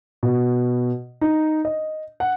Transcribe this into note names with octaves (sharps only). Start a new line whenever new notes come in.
B2
D#4
D#5
F#5